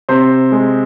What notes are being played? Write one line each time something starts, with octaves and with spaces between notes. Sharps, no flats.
C3 C5
G#3